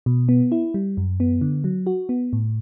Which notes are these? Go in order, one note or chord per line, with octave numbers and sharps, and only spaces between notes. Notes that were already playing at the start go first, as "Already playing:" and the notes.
B2
B3
E4
G3
F#2
B3
D3
F#3
F#4
B3
A2